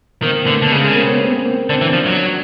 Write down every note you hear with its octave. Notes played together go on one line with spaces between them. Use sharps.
D#3 A#3 C4
D3 A3 B3
D3
C#3 G#3 A#3
G#3 A#3
A#3 C4
B3 C#4
A#3 C4
A#3 C4
D3 C4 D4
E3
F3
F#3